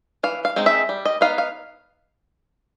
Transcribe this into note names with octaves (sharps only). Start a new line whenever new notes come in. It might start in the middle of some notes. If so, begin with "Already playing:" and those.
E3 F5
F5
G#3 C4 D#4
E5
G3
D#5
B3 D#4 F5
F5